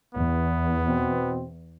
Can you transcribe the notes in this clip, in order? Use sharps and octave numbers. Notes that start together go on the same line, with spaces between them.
E2 B3
B2 C4